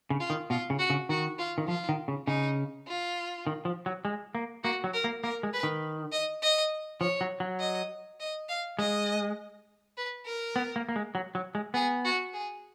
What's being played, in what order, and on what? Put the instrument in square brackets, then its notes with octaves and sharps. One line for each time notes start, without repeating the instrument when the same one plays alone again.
[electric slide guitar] C#3
[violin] F4
[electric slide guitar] D#3
[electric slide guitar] B2 [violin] F4
[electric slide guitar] C#3
[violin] F#4
[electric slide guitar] C#3
[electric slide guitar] D#3 [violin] F#4
[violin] F4
[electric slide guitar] D#3
[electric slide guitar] F3 [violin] F4
[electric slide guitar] D#3
C#3
[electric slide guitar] C#3 [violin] D#4
[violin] F4
[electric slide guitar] D#3
F3
F#3
G#3
A#3
[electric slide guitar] A#3 [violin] F#4
[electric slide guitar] F#3
[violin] A#4
[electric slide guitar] A#3
[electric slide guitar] A#3 [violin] A#4
[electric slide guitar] G#3
[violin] B4
[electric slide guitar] D#3
[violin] D#5
D#5
[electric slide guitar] F3 [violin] C#5
[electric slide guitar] F#3
F#3
[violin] D#5
D#5
F5
[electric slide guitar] G#3 [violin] D#5
[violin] B4
A#4
[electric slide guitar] B3
A#3
A#3
G#3
F#3
F#3
G#3
[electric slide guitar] B3 [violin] G#4
[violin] F#4
G#4